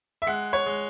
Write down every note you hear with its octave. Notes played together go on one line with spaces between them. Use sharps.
E5
G#3 F#5
C#5
G#3